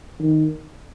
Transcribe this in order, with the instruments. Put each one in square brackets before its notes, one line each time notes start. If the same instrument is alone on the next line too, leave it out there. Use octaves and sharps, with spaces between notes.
[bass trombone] D#3